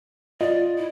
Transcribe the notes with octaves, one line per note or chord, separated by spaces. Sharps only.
F4 D5 D#5
E4